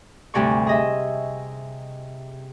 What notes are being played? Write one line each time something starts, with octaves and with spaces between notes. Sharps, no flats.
D2 G2 C3 D5 G#5 C#6
G#4 D#5 E5